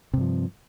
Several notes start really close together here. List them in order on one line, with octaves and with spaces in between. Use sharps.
C3 G2 F3